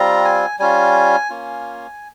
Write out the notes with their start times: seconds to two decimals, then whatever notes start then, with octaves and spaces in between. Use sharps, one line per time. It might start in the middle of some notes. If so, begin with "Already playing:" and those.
Already playing: G3 C4 F4 A#5
0.25 G#5
0.59 G3 C#4 F4 G#5
1.30 A#3 C#4 F4